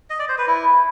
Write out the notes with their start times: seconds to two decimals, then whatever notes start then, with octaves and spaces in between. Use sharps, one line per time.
0.10 D#5
0.19 D5
0.29 C5
0.38 B4
0.47 E4